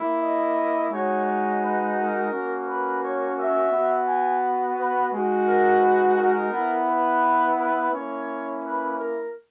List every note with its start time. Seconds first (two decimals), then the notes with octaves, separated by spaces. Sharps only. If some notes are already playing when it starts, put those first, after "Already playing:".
Already playing: A#3 E4
0.19 D#5
0.90 G#3 D#4 F#4 C#5
1.25 C#5
1.60 B4
1.95 A#4
2.30 A#3 C#4 F#4
2.65 B4
3.00 C#5
3.36 E5
3.71 B3 F#4
4.06 G#5
4.76 B4
5.11 G#3 D#4 F#4
5.46 A#4
5.81 B4
6.17 A#4
6.51 B3 E4
6.87 B4
7.57 B4
7.92 A#3 C#4 E4 C#5
8.62 B4
8.97 A#4